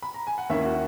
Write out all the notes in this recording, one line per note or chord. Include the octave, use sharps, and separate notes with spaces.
B5
A#5
G#5
F#5
D#2 D#3 A#3 C#4 E4 E5
F#4 F#5